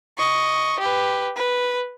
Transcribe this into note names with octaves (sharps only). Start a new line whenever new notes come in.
D#5 C#6
G4 B4
B4